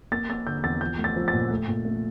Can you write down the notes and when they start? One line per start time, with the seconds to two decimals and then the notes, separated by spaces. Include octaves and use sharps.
0.12 A#3 A6
0.29 A#3 A6
0.47 D3 G6
0.64 E2 A6
0.81 F3 G6
0.98 A3
1.04 A6
1.16 F3
1.28 A6
1.33 A#2
1.50 A3
1.68 A#2
1.85 A3